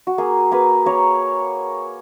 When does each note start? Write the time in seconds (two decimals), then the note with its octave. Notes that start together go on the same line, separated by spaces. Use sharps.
0.07 F#4
0.18 A#3 G#4
0.52 A#3 G#4 B4
0.86 A#3 A#4 C#5